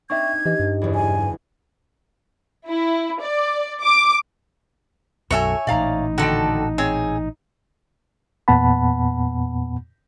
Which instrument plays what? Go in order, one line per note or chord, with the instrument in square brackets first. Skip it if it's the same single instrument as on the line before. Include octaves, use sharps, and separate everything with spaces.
[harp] C4 D4 D#4 [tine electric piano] E5 G5 C#6 [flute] G#6
[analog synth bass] E3 [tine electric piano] G4 D#5
[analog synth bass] G2
[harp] F#1 E2
[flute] G#5
[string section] E4
D5
D6
[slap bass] B1 F#2 [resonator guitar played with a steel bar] F#4 A4 [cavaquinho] C#5 E5 G#5
[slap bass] A1 A#2 [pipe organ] D#4 [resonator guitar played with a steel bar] D5 F5 A#5
[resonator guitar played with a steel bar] D3 D#3 G5 [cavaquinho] F#4 A4
[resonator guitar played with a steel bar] C4 C#5 [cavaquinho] G#4
[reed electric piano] E2 A#2 B3 F#5 A5 B5